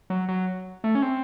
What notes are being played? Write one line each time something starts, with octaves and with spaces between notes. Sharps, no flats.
F#3
F#3
A3
C#4
C4